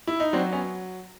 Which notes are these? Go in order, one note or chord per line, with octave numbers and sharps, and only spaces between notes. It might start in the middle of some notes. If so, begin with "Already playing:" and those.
E4
D#4
F#3 C4 D4
B3 C#4